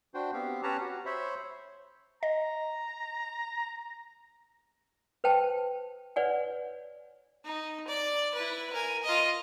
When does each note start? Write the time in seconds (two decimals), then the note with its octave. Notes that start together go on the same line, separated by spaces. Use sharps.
0.14 D4 F#4 C5 G5
0.33 B3 C4 G4 F5
0.63 C#4 G4 B4 C#5 A5 A#5
0.81 F#4
1.06 C5 C#5 E5 B5
2.23 D#5 A#5
5.24 B4 C5 G5 A5
6.16 B4 C#5 D5 F#5 G#5
7.45 D#4
7.88 D5
8.34 E4 B4
8.73 A#4 G#5
9.04 F4 D#5